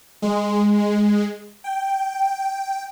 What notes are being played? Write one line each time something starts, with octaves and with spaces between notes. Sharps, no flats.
G#3
G5